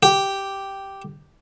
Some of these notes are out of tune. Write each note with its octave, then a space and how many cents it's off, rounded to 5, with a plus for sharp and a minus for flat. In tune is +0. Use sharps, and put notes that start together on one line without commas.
G4 -5